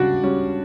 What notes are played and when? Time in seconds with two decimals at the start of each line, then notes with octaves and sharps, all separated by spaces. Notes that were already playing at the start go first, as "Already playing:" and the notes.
Already playing: C#3 G3 D4 F#4
0.23 G3 C#4